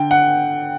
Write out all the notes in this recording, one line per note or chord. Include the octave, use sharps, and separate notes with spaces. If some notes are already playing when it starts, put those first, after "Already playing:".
Already playing: D3 G5
F#5